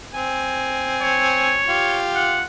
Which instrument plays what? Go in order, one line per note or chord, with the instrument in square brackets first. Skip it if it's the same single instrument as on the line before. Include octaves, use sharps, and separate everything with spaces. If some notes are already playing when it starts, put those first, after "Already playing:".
[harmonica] C4 G#5
[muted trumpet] C#5
[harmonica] F4 G4
[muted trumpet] F#5